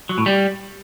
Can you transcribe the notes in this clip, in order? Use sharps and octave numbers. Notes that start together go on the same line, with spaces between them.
F#3
A2
G3